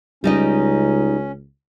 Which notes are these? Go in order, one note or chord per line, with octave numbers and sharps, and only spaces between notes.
C#2 G3 C#4 D#4 D#5